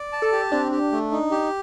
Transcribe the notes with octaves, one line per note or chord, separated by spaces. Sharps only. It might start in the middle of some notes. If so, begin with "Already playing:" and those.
Already playing: D5
A5
A4
G4
C4 D4
G4
A3
D#4
G4